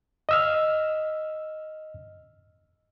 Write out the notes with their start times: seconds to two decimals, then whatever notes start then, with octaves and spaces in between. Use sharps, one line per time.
0.29 D#5 E6 F6